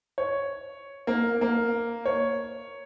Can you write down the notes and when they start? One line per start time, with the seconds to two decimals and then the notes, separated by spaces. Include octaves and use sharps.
0.18 C#5
1.07 A#3
1.41 A#3
2.06 C#5